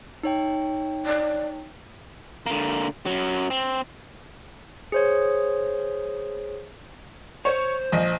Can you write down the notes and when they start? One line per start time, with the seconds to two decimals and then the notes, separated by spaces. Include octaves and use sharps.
0.23 D#4 C#5 G5
1.06 D5
2.46 D3 A#3
3.06 F#2 F#3
3.50 C4
4.92 G#4 C5 C#5
7.45 C5 C#5
7.92 A#1 D#5